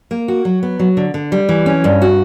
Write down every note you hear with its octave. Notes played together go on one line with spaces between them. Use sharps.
A#3
F#4
F#3
B3
F#3
D3
D3
G3
E3
C#4
G2
F#4